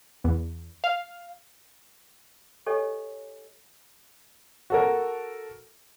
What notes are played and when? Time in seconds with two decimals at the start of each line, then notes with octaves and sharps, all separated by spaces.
0.24 E2
0.84 F5
2.66 G4 A4 C#5 D#5 G#5
4.70 F#4 A4 A#4